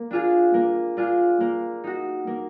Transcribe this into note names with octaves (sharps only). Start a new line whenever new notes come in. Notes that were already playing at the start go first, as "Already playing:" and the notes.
Already playing: A#3
D4 F4 G#4
A#3
D4 F4 G#4
A#3
D#4 F#4
A#3